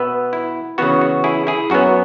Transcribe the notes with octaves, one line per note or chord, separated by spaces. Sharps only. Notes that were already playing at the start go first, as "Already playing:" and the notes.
Already playing: B2 B3 B4 E5
E4
C#3 E3 B3 F#4
F#4
E4 G#4
E4 G#4
F#2 F#3 B3 F#4